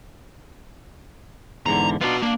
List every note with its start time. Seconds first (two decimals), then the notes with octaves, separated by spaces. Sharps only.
1.66 E2 G#2 D3 A#5
2.01 B3 D4 D#4 F4 F#4
2.22 A#3 D4